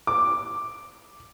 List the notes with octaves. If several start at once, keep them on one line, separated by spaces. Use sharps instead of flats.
D6